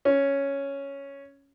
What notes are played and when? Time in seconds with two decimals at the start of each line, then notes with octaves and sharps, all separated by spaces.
0.05 C#4